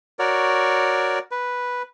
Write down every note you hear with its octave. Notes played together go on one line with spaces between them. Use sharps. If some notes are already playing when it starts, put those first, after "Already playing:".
F#4 A#4 C#5 D5
B4